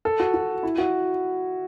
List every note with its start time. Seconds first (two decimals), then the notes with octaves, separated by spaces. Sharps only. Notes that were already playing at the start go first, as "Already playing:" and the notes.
0.05 A4
0.20 F#4
0.34 F#4
0.63 E4
0.78 F#4